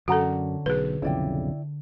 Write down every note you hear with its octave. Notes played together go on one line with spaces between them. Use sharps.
F#2 D3 C#4 F#4 A4 F#5 A#5
B1 G#4 B4
B1 F2 C#3 E4 D5 G5